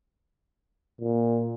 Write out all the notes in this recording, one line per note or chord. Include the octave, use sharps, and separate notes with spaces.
A#2